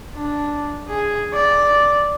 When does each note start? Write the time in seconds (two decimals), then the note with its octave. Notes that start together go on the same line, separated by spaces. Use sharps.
0.15 D4
0.89 G#4
1.34 D5